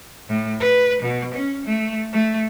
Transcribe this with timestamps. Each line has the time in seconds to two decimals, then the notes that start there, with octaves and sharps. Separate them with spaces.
0.29 A2
0.60 B4
1.02 B2
1.34 C#4
1.65 A3
2.13 A3